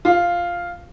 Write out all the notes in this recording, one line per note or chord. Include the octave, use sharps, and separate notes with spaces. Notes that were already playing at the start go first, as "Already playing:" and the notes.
F4